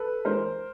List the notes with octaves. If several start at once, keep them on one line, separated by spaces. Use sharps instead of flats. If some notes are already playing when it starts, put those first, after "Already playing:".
Already playing: A4 B4
E3 G#3 A#4 C5